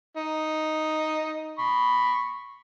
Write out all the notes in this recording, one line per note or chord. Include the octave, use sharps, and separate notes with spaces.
D#4
B5 C#6